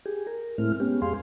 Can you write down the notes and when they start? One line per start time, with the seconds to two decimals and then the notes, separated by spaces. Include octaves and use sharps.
0.06 G4 G#4
0.27 A#4
0.58 A2 G#3 A3 C4 E4 F6
0.80 G#3 B3 C#4 G4
1.02 F2 G#3 G4 G#4 F5 C6